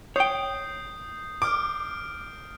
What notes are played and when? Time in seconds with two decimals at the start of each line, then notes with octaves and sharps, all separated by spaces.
0.16 C#5 G5 D#6 G6 C7
1.42 D6 F6 D7